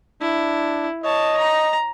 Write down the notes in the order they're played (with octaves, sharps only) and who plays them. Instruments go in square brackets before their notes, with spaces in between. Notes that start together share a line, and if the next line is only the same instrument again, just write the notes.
[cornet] D4 [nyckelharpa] E4
[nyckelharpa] C#5 A5 [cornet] D#5
[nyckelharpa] A#5